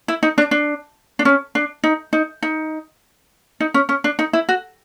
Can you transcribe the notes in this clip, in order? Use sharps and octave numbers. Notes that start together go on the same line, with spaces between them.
E4
D#4
D4
D4
D4
C#4
D4
D#4
D#4
D#4
D#4
C#4
C#4
D4
D#4
E4
F#4